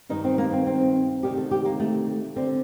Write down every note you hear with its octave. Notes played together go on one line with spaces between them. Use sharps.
G2 D#3 D#4
C4
A#3
C4
C4
D2 C3 D#3 G4
A4
G4
A#3
A3
D3 C4